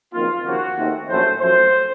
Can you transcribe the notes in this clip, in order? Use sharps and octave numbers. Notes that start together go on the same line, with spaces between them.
F#1 F2 D#3 A#3 F4
D#2 C#3 F3 A#3 F#4
D#2 D#3 A3 C4
A#1 A2 F#3 A3 C#4 C5
F#2 F3 A3 C5